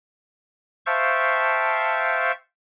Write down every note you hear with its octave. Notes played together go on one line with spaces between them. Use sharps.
C5 E5 F5 G5 A5 C#6